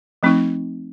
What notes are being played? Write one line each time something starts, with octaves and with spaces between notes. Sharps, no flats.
F3 A3 C4 D#4